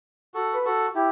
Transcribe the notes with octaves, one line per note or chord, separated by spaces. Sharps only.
F#4 A4
B4
F#4 A4
E4 G4